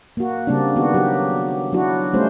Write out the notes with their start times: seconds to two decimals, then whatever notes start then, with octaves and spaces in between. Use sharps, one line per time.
0.17 A#3 F#4
0.47 C#3 G3 A#3 C4 D4
0.76 D#3 B3 F#4
0.94 F#3 G4
1.73 F#3 D4 E4 F#4
2.14 G3 A3 C#4 F4 C5